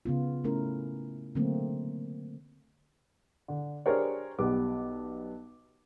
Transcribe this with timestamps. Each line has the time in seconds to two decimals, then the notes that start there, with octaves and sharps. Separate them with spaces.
0.05 C#3 B3 F4
0.44 A3 C#4 E4 A#4
1.35 D3 F#3 A3 A#3 C4
3.48 D3
3.86 D4 G4 G#4 A#4 C5 C#5
4.39 B1 G3 B3 D6